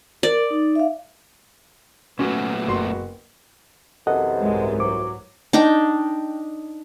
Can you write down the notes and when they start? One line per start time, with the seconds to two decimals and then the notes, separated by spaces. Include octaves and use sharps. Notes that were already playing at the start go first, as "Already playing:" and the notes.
0.23 A#4 D5
0.50 D#4
0.75 E5 F5
2.19 A#2 F#3 A3 B3 C#4 F#4 B4
2.68 F#1 F#4 C6
4.07 F#2 C3 E3 A4 D#5 F#5
4.40 C2 G#2 G#3
4.80 F#3 D6
5.53 D4 D#4 G5